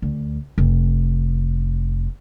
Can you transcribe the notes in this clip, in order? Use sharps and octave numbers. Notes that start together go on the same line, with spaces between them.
D2
F1